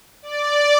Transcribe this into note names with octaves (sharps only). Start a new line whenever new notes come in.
D5